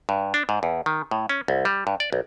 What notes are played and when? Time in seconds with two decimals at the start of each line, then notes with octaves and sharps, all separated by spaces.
0.09 G2
0.34 D4
0.49 G#2
0.63 E2
0.86 D#3
1.11 A2
1.29 C#4
1.48 C2
1.65 G3
1.87 G2
2.00 D5
2.13 B1